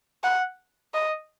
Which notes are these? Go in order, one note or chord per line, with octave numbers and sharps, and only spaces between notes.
F#5
D#5